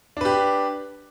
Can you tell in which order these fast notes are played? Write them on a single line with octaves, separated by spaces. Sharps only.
D4 B4 G4